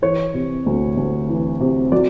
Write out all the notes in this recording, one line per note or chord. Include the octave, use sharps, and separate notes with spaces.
E3 C#5
C3
D2
D2
E3
C3
F#3 D5